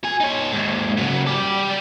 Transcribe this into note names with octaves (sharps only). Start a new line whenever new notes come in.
F#4 G#5
D#4 C#5
D#2 G#2
C#3 F#3
G3 D5